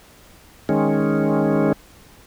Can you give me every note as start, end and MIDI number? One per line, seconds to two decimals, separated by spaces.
0.69 1.73 51
0.69 1.73 56
0.69 1.73 61